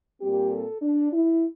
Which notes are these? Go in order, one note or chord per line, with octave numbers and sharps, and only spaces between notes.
A#2 G3 C4 G4
A4
D4
E4